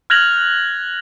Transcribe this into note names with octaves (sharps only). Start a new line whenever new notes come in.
F6 F#6 G#6 A#6 F7 F#7